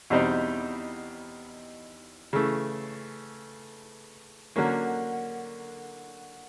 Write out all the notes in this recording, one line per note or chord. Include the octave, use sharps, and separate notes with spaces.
E2 B2 G3 C4 D#4
C#3 E3 A3
D3 F#3 A#3 C#4